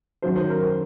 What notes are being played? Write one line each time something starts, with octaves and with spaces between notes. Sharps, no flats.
F#2 D#3 F#3 C5
C5
A#4